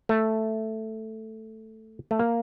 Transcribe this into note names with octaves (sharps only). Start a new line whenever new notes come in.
A3
A3
A#3